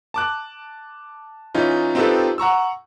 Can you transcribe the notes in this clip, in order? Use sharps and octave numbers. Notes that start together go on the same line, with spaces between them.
A5 D6 F#6
E3 C#4 D#4 F4
C4 D#4 F4 G4 A4 B4
F#5 A#5 C#6 E6